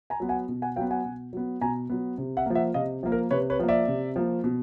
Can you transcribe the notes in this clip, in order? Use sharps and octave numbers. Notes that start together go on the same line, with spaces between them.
G#5 A#5
F#3 B3
F#5 G#5
B2
F#5 G#5
F#3 B3 F5 G5
F#5 G#5
B2
F#3 B3
B2 G#5 A#5
F#3 B3
C3
E5 F#5
F3 A#3
E5 F#5
C3 D#5 F5
F3 A#3
A#4
C3 B4 C#5
B4 C#5
F3 A#3
D5 E5
C3
F3 A#3
B2